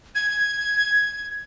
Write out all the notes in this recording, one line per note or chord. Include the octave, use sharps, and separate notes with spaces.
G#6